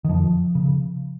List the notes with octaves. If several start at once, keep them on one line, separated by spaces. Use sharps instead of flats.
D#3
F2 F3
C#3